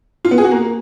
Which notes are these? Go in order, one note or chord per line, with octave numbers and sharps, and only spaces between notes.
F4
B3
G#4
F#4
A#3